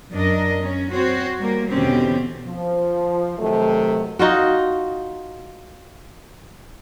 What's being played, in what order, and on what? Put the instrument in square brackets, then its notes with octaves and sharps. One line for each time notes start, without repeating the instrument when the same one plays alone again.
[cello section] F#2 D4 A#4 D#5
C#4
C4 F#4 C5 C#5
G3 A#3 A#4
E2 B2 D3 C4 C#4 G4
[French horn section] F3
C3 D#3 F#3 A3
[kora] D#4 F4 F#4